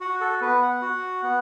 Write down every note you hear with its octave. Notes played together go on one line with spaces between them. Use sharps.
F#4 F#5
A4
B3 B4
F#5
F#4
B3